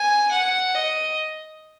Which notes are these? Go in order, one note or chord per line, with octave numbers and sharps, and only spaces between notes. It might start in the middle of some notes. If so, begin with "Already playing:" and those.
Already playing: G#5
F#5
D#5